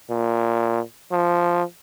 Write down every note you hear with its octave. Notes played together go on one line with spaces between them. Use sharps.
A#2
F3